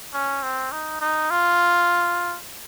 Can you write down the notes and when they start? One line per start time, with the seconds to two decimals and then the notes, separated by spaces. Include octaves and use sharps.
0.14 C#4
0.43 C4
0.72 D#4
1.01 D#4
1.31 F4